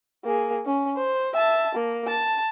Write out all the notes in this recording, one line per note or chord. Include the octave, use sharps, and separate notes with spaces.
A#3 G#4
C#4
C5
E5 A5
A#3
A5